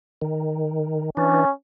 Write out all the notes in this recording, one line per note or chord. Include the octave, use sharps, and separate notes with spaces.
D#3
E3 C#4 D4